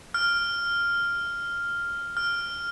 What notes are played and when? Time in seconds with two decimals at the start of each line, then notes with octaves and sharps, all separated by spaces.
0.14 F6
2.17 F6